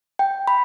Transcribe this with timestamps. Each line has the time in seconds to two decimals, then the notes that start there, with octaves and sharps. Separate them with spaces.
0.19 G5
0.47 B5